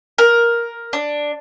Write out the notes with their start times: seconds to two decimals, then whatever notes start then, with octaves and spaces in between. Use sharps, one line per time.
0.18 A#4
0.93 D4